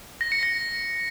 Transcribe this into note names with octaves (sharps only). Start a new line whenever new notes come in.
A#6
C#7
A#6